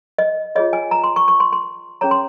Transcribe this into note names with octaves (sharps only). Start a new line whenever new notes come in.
D#5
F4 G#4 C#5 D#5
G#5
A#5
C6
C#6
C#6
C6
C6
C#4 G#4 C#5 A#5
C6